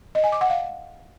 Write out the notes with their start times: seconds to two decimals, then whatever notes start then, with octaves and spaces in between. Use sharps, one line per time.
0.15 D#5
0.24 G#5
0.32 D6
0.41 F#5
0.50 F5